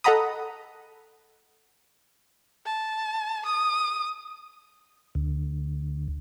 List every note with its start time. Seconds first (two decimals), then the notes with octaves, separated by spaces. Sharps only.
0.04 A4 D#5 F#5 A#5 B5 D#6
2.66 A5
3.45 D#6
5.15 D2